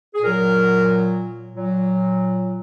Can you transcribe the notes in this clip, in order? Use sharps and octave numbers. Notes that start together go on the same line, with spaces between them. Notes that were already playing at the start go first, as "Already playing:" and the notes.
G#4
A#2 F#3 A#4
A#2 F#3